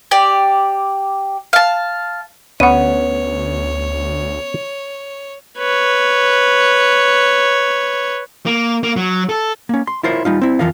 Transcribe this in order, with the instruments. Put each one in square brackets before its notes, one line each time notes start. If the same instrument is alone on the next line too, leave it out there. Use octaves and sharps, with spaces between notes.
[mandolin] G4 D5
F5 A5
[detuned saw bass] D2 [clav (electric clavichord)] B3 C#4 [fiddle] C#5 [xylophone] F#5 D#7
[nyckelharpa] B4 C#5
[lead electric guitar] A#3
A#3
F#3
A4
[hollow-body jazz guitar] A#3 C#4
C6
E4 F4 A#4 C5 C#5
G3 D#4 F4
C4 E4
F2 E3 F4 A#4 F5